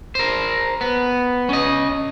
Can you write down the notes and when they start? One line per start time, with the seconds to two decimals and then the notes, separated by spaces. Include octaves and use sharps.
0.15 A#4 C5
0.81 B3
1.49 C#4 D#5